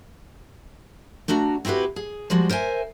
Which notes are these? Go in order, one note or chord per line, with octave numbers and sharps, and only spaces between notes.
A3 D4 F#4 A#5
C4 E4 F#4 G4 B4
G#4
F3 G3 G#3 F#4
A#4 C5 E5 G#5